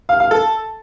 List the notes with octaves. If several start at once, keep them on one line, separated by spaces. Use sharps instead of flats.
F5
F5
A4